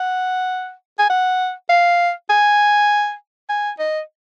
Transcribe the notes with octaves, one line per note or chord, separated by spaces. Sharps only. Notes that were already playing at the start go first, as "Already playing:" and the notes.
Already playing: F#5
G#5
F#5
F5
G#5
G#5
D#5